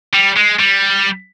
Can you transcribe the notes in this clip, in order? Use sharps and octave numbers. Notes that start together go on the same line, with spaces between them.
G3
G#3
G3